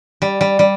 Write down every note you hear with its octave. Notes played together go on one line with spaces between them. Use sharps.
G3
G3
G3